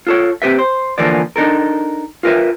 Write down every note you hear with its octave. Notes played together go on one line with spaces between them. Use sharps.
F4 A4 C#5
C4 G4 B4 E5
C5
D3 E3 F3 A#3 B3 D5
D4 D#4 A4 A#4
F4 A#4 B4 E5